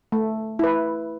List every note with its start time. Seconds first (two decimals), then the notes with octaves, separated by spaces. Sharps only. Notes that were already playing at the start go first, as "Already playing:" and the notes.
0.12 A3
0.59 E4 B4